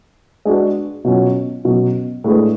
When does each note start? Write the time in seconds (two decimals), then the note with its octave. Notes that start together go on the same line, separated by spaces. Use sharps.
0.45 G#3 D4 F#4 B4
1.04 B2 F#3 C#4 F4
1.65 B2 F#3 C#4
2.24 A2 G#3 D4 G#4 B4